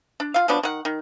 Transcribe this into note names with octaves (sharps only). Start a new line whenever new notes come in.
D4
F4 F5
F3 F#3 B3 D4
D#3 F#5
D#3